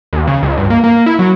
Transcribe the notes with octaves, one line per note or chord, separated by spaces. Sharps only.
D#2
C#3
C#2
G2
A#3
A#3
E4
F#3